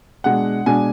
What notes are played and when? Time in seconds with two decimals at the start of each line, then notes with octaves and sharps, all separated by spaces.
0.24 B2 G#3 D4 F#5
0.66 B2 G#3 D4 G#5